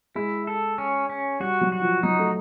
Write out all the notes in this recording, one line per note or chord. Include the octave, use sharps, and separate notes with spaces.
G#3 E4
A4
C#4
C#4
G3 F#4
F#3
F#4
F3
F#3 D#4
A3